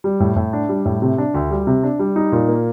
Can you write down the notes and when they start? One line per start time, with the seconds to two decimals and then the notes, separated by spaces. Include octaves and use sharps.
0.04 G3
0.20 A2
0.36 A2
0.53 D4
0.69 G3
0.85 A2
1.02 C3
1.18 D4
1.34 D2
1.51 G3
1.67 C3
1.83 D4
1.99 G3
2.16 D#4
2.32 A#2
2.48 A#3